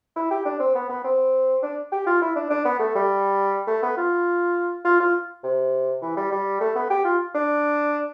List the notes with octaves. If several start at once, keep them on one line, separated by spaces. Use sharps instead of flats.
E4
G4
D4
C4
B3
B3
C4
D4
G4
F4
E4
D4
D4
B3
A3
G3
A3
B3
F4
F4
F4
C3
E3
G3
G3
A3
B3
G4
F4
D4